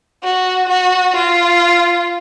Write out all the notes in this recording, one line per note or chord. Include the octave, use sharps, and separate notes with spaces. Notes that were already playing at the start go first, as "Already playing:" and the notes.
F#4
F#4
F4